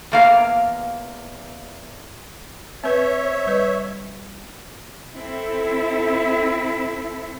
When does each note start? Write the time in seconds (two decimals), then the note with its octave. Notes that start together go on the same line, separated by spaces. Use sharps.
0.12 E2 A#3 F5
2.84 C4 B4 C#5 E5
3.24 C5
3.47 G3 B4 D#5
5.14 C4 E4 A4